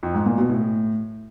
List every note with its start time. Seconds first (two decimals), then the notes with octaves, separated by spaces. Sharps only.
0.03 F2
0.14 G#2
0.26 A#2
0.38 B2
0.50 A2